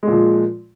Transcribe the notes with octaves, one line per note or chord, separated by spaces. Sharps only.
A#2 F3 G#3